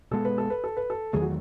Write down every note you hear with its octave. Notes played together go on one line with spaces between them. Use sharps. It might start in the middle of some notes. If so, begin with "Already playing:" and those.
B2 G#3 B3 A4
B4
A4
B4
A4
B4
A4
E2 D#3 F#3 A3 G#4
F#4